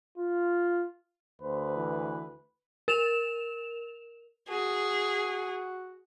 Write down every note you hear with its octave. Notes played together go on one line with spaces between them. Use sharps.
F4
D2 B4 C5
E3
A#4 E7 F7
F#4 G#4